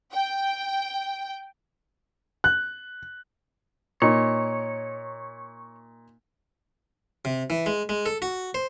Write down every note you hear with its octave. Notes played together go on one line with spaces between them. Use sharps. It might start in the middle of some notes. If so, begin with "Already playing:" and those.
G5
F#6
A#2 D#4 C#5
C3
E3
G#3
G#3
A4
F#4
C5